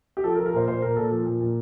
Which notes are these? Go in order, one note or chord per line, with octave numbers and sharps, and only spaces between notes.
G4
F3 A4
A#4
F3
A#4
A#2 C5
A#2 C5
A#2 A#4
A#2 A4
F3
A#2
A#2